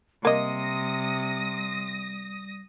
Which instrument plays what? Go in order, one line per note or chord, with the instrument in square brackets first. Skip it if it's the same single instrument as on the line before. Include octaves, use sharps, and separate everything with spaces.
[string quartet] C3 [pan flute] G3 [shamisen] A#3 D#5 [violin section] D#6 A#6